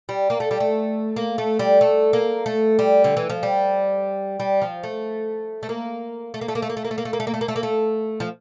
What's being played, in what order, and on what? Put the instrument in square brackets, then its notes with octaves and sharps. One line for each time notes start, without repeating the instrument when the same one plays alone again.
[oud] G3
A#3
A3
G3
A3
A#3
A3
G3
A3
A#3
A3
G3
D3
E3
F3
G3
G3
F3
A3
A3
A#3
A3
A#3
A3
A#3
A3
A#3
A3
A#3
A3
A#3
A3
A#3
A3
A#3
A3
A#3
A3
A#3
A3
F3